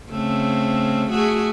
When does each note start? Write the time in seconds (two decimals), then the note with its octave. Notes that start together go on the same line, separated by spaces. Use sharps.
0.11 C#3 A3 C4
1.10 A3 F#4 G#4